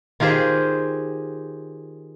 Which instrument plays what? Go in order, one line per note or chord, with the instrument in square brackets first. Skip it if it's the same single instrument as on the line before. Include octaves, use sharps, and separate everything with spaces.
[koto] D#3 F4 G4 G#4 C5